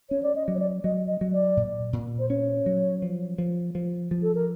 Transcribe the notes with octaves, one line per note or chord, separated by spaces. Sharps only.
C#4 C#5
D5
D#5
F#3
C#5
D5
F#3 D#5
D#5
F#3
D5
A#2
A#2
C5
C#4 C#5
F#3
F3
F3
F3
F3
A4
A#4